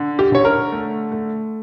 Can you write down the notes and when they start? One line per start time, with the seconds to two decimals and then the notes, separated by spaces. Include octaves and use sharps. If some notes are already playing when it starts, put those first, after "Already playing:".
Already playing: D3
0.19 G4
0.32 D3 C#5
0.45 A#4
0.72 A3
1.12 A3